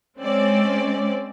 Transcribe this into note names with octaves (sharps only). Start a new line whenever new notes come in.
G#3 C4 C#4 D5